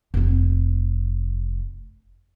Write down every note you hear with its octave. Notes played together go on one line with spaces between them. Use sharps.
F1 C4